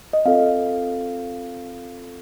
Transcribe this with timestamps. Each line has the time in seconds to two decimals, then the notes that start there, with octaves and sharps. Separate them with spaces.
0.13 D#5
0.25 C4 F4 A4 F5